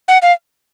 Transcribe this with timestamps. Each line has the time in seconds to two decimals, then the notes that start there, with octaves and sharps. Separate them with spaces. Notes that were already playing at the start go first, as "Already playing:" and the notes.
0.08 F#5
0.22 F5